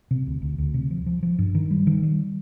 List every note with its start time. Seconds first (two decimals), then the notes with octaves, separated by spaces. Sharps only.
0.11 C3
0.27 D2
0.42 D2
0.58 D2
0.74 C3
0.91 F3
1.06 F3
1.23 F3
1.39 G2
1.55 D#3
1.71 G3
1.87 D#3
2.03 G3